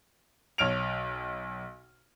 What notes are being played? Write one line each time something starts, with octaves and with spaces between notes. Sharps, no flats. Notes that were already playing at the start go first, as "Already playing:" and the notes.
B1 C#5 F6 D7 F7